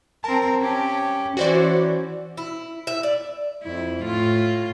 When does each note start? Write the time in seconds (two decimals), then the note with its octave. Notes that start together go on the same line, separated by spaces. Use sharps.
0.24 C4 A#4 A5
0.61 C#4 G4
1.37 E3 C#4 F#4 C5 D5
2.37 E4
2.87 E5
3.03 D5
3.63 F2 E4
4.03 A2 F4